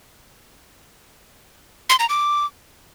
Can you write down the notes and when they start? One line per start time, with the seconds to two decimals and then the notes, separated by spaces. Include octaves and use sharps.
1.90 C6
1.99 A#5
2.09 D6